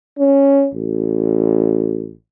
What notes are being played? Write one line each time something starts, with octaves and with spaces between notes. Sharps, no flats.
C#4
A1